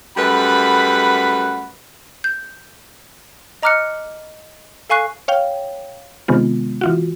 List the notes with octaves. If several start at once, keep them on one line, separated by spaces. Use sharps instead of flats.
F#2 G3 A3 B4 F#5 B5
G6
D#5 A#5 D6 F6 F#6 C#7
A4 F5 G#5 C#6 F#6 C7
C#5 F5 G5
C3 D#3 G#3 B3 F4
E3 F4 F#4